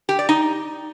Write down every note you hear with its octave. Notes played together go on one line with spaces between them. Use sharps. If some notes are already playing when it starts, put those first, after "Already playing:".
G4
D5
D#4